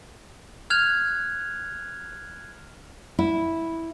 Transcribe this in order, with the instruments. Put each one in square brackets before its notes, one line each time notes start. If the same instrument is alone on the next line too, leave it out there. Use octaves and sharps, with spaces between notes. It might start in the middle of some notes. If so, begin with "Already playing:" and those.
[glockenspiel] F6 F#6 G#6 F7
[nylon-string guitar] E4